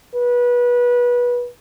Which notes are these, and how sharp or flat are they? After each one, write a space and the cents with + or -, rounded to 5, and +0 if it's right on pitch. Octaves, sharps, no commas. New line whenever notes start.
B4 -25